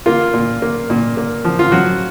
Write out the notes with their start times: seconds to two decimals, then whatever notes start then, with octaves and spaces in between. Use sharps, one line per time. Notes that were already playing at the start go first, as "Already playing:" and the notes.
0.06 A#3 F4
0.34 A#2
0.62 A#3
0.90 A#2
1.17 A#3
1.45 F3
1.59 F4
1.72 F#3 F#4